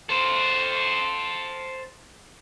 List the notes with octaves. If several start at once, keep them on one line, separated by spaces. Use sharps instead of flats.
A4 C5